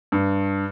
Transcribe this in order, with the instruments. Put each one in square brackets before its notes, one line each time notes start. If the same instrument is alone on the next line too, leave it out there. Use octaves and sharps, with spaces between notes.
[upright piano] G2